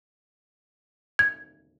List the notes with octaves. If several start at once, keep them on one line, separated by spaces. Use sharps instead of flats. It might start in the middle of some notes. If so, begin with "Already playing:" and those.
G#6